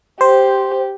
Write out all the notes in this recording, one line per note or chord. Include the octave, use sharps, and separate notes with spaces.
G4 C5